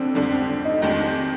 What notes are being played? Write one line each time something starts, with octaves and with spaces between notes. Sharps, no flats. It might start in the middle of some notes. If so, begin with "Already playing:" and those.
Already playing: F2 D3 C4 D4
F2 D3 G3 D4
C4
D4
D#4
F2 D#3 G#3 D4 D#4 G4
C4